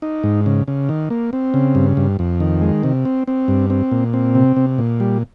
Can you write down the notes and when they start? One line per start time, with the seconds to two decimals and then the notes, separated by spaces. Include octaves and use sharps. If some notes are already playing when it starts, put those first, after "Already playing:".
0.02 D#4
0.23 G#2
0.46 C#3
0.68 C#3
0.89 D#3
1.10 A#3
1.33 C4
1.54 C#3
1.75 G2
1.97 G2
2.19 F2
2.40 D#3
2.61 G#3
2.83 C3
3.05 C4
3.28 C4
3.48 G2
3.70 C4
3.92 A#2
4.14 C4
4.35 C3
4.56 C3
4.78 A#2
5.00 G3